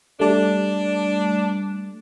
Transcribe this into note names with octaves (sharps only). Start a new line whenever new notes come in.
G3 A3 D4